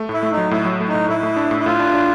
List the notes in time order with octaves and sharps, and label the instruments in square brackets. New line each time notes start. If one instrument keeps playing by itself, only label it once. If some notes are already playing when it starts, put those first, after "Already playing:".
Already playing: [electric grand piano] A3
[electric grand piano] A2 [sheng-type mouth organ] E4
[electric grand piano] A3
[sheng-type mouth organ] D#4
[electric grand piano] F#3
[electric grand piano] A2 [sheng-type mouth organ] E4
[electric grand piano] F#3
A3
[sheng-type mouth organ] D#4
[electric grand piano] A2
[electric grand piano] A2 [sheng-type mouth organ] E4
[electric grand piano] A2
D4
A2
[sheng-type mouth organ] E4
[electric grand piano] A2 [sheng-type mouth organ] F4
[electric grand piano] D4
D4